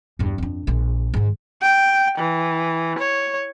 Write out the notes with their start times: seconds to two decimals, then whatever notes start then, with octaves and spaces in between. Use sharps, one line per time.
0.19 E2 G2
0.38 F2 D4
0.67 A#1 G#3
1.14 G#2 D#3
1.62 G5
2.19 E3
2.99 C#5